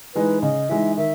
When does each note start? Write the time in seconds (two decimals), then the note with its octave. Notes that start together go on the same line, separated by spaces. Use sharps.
0.15 E3 G#3 D#4 B4
0.42 C#3 D#5
0.69 E3 G#3 D#4 E5
0.96 D#3 E5